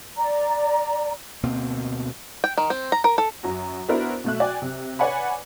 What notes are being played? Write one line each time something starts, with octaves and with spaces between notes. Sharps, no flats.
D5 A#5
D2 B2 A#3 C4
G5
D#3
C4
A#5
A#4
A4
F#2 F#4 A#5
B3 D4 E4 F#4 A#4 C5
B2 F#3 A3 E5 F#6
F#4 D5 G5 G#5
C3
B4 C#5 D5 F#5 G#5 B5